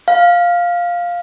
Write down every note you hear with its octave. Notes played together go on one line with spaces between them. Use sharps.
F5